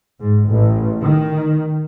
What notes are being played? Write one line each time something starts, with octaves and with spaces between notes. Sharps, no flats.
G#2
A1
D#3